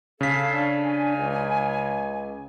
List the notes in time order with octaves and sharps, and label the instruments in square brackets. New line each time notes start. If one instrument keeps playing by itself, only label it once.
[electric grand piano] C#3 B6 [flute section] C#4 A4 F5
[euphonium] D4
[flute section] G#5
[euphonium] C#2